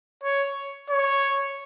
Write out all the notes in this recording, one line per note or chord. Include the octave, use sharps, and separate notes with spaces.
C#5
C#5